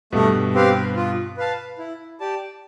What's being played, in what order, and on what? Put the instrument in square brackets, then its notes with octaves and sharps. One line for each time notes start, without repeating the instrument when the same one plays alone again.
[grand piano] G2 B2 [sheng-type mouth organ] A3
[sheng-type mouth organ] C4 G4 B4 F5
F4
B4 F5 A5
E4
G4 D5 A5